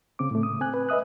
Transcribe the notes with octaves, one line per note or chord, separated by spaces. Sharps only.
C#3 C4 D6
A2 A3
D#6
C4 G#5 F#6
B4
B4 D#5 E5 D#6 F#6